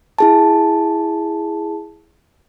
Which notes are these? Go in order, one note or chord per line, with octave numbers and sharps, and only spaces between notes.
E4 G#4 A5